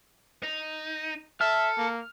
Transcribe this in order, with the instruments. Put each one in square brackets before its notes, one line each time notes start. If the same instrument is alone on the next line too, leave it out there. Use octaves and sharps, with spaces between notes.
[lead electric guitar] D#4
[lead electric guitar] A4 [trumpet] E5 [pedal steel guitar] F6
[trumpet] A#3